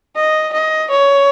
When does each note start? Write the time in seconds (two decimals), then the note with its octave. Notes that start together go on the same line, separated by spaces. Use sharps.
0.16 D#5
0.53 D#5
0.90 C#5